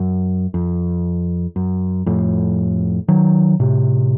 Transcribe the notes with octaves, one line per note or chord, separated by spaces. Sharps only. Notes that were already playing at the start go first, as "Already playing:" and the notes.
Already playing: F#2
F2
F#2
F2 A2
D#3 F#3
A2 C3